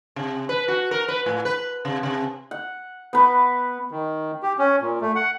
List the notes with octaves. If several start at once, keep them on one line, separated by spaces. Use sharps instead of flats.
C3
B4
F#4
A#4
B4
A2
B4
C3
C3
F#5
B3 B4
D#3
G4
C#4
A#2
A3
F#5